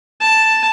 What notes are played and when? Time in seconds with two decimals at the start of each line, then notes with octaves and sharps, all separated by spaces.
0.21 A5